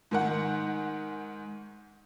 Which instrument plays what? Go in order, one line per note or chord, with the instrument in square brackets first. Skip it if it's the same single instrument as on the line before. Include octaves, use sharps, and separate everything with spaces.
[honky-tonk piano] G#2 D#3 F#5